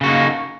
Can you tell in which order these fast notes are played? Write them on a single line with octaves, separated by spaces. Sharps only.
C#3 F#4 A#3 D#4